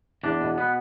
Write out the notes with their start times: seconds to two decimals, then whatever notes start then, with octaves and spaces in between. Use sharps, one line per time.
0.24 E2 D4
0.41 B2
0.58 B3